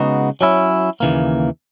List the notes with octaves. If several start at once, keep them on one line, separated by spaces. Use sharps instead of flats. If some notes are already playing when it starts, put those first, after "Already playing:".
Already playing: C#3 G#3 B3 D#4 F#4
F#3 C#4 E4
D#2 C#3 E3 A#3